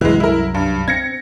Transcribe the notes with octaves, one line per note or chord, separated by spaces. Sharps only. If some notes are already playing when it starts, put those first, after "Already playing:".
C2 F#2 E3 F#3 G#3
E4 A#4
G2
C4 G#6 A#6 C#7